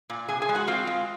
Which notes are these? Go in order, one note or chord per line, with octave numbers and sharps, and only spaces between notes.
A#2
C3 G#4 G#5
G#4 G#5
G#3
F#4 F#5
C4 F4 F5
G#3